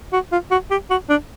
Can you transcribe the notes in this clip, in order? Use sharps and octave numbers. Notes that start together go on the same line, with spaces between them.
F#4
F4
F#4
G4
F#4
D4